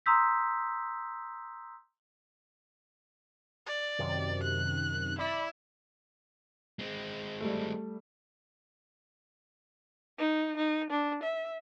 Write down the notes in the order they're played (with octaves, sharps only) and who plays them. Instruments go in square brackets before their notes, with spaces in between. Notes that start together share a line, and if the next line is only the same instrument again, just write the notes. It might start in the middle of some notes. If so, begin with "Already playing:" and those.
[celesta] A#5 C6 D#6 E6 G6 B6
[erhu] D5
[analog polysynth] F#2 C3 D#3
[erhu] F#6
[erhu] E4 [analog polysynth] D5 E5 B5
[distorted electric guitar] G#3 C4
[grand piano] G3 A3
[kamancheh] D#4
D#4
D4
E5